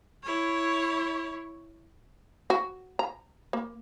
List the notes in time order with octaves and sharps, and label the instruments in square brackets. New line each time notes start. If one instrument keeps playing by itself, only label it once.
[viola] E4 C#5
[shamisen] F#4
A#5
A#3